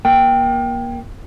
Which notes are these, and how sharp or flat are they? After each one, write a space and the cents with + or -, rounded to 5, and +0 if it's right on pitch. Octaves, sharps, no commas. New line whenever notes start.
A#3 +30 G5 +0